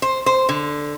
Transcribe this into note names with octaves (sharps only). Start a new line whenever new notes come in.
C5
C5
D3